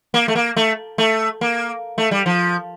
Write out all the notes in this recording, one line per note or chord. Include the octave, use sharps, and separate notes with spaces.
A#3
A3
A#3
A3
A3
A#3
A3
G3
F3